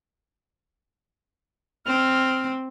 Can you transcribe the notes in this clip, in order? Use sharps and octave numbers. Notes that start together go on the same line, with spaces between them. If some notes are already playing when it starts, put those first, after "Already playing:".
C4 F6